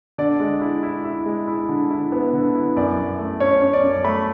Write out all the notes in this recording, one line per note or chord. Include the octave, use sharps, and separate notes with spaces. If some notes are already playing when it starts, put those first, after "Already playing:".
D3 D5
G#3
E4
E4
E4
G#3
E4
D3
E4
B3
D3
E4
F#2 D5
F#2
A3
C#4 C#5
C#4
D5
F#2
A3 B5